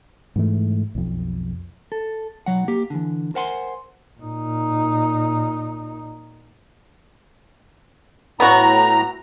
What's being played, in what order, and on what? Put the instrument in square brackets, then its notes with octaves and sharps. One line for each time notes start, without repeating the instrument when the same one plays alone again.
[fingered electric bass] G#2 E3 A3
B1 F2
[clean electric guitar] A4
B1 F#3 F#5
A#3 G4
D3 E3
A#4 C5 F#5 G#5 C6
[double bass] A#2 D#4
[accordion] A2 A#5 [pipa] B3 F#4